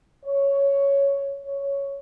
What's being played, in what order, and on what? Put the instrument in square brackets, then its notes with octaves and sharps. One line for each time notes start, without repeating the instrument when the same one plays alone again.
[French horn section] C#5
C#5